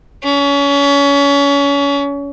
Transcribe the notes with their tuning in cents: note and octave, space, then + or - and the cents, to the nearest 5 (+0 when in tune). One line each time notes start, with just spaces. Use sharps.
C#4 +30